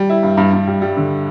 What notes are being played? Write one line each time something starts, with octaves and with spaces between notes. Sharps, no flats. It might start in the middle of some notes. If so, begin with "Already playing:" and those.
Already playing: G3
E4
G2
G2
G2
G3
G3
D3